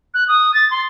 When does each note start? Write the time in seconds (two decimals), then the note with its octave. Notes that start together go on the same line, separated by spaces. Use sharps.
0.14 F#6
0.28 D#6
0.54 A6
0.71 C6